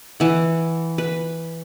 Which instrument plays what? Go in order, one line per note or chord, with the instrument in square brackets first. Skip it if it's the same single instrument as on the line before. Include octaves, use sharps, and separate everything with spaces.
[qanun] E3 F#5
B4